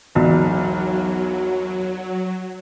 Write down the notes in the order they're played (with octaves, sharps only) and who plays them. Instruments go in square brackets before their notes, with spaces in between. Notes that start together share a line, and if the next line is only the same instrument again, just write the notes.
[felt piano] E1 B1 [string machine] F#3